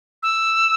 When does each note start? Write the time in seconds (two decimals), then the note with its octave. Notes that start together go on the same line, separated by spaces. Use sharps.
0.23 E6